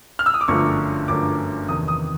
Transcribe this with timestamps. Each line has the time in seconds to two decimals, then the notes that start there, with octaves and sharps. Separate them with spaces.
0.19 F6
0.26 E6
0.34 D#6
0.41 D6
0.48 G1 F#2 D3 F3 A3 C#6
1.08 G1 F#2 D3 F3 A3 D6
1.68 E2 C3 D#3 D#6
1.88 D#6